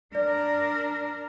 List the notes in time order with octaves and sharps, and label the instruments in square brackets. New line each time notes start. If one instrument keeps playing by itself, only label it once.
[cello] D4 A#4 [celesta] D5